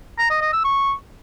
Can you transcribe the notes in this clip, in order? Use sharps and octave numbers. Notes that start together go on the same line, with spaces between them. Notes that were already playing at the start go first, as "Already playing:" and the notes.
A#5
D#5
D#5
E6
C#6